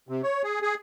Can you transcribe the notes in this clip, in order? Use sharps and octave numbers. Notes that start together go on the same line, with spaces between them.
C3
C#5
G#4
G#4